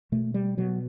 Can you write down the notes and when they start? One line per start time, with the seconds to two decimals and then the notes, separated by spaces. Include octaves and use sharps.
0.12 B2 A3
0.34 G3
0.57 B2 F#3